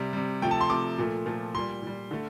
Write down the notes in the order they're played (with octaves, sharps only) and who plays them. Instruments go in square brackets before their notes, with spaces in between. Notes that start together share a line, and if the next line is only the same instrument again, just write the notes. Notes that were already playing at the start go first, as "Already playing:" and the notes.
Already playing: [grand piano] C3 G3
C3 G3
C3 F3 A3 G5
A5
C6
C3 F3 A3 D6
A#2 F3 A3
A#2 F3 A3
A#2 G3 C6
A#2 G3
D3 A3